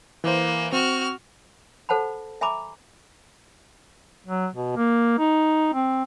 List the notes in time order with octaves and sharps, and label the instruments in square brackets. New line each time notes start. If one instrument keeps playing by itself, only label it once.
[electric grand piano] E3 C5 [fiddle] A#3
[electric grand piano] C4 [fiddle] F#4 F6
[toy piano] A4 C5 F#5 A5 B5
E5 G#5 A#5 B5 D6
[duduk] F#3
B2
A#3
D#4
C4